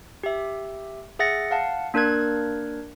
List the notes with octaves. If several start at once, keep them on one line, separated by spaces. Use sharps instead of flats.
G4 E5
G#4 E5 F#5 A6 A#6 C#7
F5 F#5 A5
A#3 D4 A#4 F#6 G#6